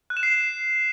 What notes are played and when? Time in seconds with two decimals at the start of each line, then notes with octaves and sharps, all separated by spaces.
0.10 F#6
0.17 E7
0.23 C7